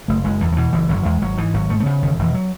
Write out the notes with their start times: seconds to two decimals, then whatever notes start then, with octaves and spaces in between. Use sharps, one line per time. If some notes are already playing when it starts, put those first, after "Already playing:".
0.08 F#1 A3
0.24 F#1 G#3
0.41 E2 E3
0.52 F#3
0.57 B2 E3
0.73 F#1 E3
0.89 F#1 F#3
1.05 E2 G#3
1.21 G#1 F#3
1.38 G#2 E3
1.54 G#1 F#3
1.70 G#2 A3
1.80 A3
1.86 C#3 B3
2.02 E1 D#3
2.19 E1 E3
2.34 F#3